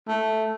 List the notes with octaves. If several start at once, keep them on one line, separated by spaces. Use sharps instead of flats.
A3